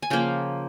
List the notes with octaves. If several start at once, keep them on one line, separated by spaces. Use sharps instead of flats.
G#5
C#3 F3 A#3 F5 G5